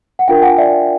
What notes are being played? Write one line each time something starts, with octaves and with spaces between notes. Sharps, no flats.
F#5
D4 F4 A#4 F5 G5
F#5 G#5
D5 E5